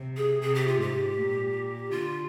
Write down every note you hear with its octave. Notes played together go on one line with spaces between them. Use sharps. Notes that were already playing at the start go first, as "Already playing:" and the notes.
Already playing: C3
G#4
C3 G#4
G4
F4
G#2 G4
A#2
D3 F4